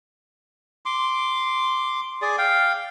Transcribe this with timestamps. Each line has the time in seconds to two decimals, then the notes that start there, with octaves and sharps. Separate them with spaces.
0.86 C6 D6
2.22 G#4 D5
2.38 F5 G5